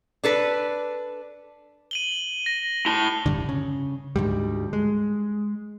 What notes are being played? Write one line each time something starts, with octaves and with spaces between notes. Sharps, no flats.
D4 A4 B4
D#7 F#7 G7
A#6
E4 A5 G7
E1 G2 D3
C#3
D2 G#2 G3
G#3